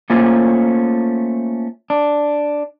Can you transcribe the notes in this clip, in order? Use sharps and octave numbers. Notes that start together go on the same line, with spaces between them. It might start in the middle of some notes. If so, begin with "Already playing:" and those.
A3 A#3 C#4 F4 C5
D4